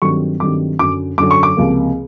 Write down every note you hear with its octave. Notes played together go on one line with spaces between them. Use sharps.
G2 D#3 F#3 A3 C4 C#6
G2 D#3 F#3 A3 C4 D6
F#2 D3 F#3 D6
F#2 D3 F#3 D6
C#6
D6
C#2 C3 F3 A#3